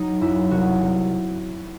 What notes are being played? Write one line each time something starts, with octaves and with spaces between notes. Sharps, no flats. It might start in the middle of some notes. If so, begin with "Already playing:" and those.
Already playing: F#3 D#4
F#2 E4
C2 F#4
C2